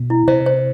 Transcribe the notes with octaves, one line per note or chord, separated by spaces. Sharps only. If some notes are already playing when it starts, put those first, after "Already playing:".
Already playing: B2
E4
C3 C5
C5